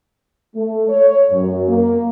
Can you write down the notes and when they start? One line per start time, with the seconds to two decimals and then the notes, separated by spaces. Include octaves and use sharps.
0.55 A3
0.89 C#5
1.31 F#2
1.67 A#3